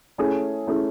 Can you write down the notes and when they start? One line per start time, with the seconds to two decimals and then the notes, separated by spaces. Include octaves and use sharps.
0.18 A3 C#4 E4 G#4
0.67 A3 C#4 E4 G#4